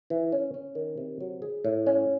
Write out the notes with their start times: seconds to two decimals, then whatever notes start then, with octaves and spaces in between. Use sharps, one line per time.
0.10 E3
0.32 C#4
0.54 C#4
0.75 D#3
0.97 C3
1.20 F#3
1.42 G#4
1.65 A2
1.87 C#4